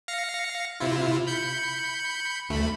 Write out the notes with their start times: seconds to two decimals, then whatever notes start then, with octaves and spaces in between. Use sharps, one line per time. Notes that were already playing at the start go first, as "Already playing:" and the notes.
0.08 F5 A#6 C#7
0.80 C3 E4 F4
1.27 B5 G6 C#7
2.49 D2 A3 B5